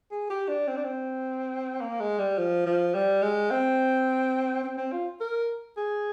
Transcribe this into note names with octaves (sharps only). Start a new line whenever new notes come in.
G#4
G4
D4
C4
D4
C4
A#3
G#3
G3
F3
F3
G3
G#3
C4
C4
C4
F4
A#4
G#4